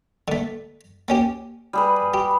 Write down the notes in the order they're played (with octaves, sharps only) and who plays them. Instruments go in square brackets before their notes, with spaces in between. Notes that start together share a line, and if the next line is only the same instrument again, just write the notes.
[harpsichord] D3 A3
A#3 C#4 G4
[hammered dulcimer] G3 G#4 B4
[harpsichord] G4